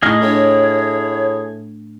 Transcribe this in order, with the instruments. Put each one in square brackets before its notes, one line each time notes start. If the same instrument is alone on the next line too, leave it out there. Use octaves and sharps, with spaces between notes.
[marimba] A2 A3 [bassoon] D#4 [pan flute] E4 [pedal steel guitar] G#4 D#5 F6
[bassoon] A2 [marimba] D4 [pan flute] C#5